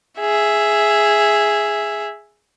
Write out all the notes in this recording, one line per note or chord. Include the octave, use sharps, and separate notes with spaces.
G#4 E5